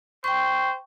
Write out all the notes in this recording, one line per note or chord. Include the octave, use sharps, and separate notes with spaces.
C5 G5 C#6